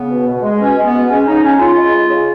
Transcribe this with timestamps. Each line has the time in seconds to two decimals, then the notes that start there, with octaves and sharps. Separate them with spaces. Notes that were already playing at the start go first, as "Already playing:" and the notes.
Already playing: C#3 B3
0.10 B2
0.26 B2
0.43 G#3
0.59 B2 C#4
0.76 G#3
0.85 B3
0.93 B2
1.09 G#3 C#4
1.26 C#3 D#4
1.43 C#3 C#4
1.59 C#3 F4
1.76 G#3
1.93 G#3
2.10 C#3